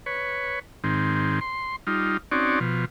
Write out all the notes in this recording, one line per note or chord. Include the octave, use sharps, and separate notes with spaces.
B4 C#5
G#2 D#3 C4
C6
G3 D#4 F4
C4 C#4 D#4 F#4 D5
B2 F3